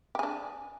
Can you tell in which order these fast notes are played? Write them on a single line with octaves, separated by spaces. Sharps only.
G4 G#4 D4